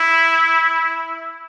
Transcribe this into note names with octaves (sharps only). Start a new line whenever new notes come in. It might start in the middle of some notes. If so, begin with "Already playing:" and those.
Already playing: E4